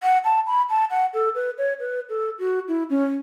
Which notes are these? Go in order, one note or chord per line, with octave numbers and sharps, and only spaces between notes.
F#5
A5
B5
A5
F#5
A4
B4
C#5
B4
A4
F#4
E4
C#4